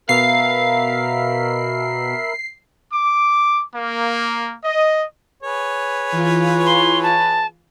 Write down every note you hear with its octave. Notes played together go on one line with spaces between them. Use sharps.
B2 A#4 E5 F5 B5 C7
D6
A#3
D#5
G#4 B4 C#5
E3 F4
C6
A5